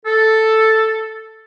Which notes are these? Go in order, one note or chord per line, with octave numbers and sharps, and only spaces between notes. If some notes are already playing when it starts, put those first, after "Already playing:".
A4